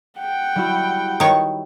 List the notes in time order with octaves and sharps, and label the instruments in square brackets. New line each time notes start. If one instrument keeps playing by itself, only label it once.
[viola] F#5 G5
[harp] G3 E4 F#4
[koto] D#3 C#5